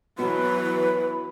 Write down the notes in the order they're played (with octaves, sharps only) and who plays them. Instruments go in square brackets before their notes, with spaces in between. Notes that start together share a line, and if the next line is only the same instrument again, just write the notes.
[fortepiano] B2 F#4 [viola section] E3 F#3 [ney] B4 [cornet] B5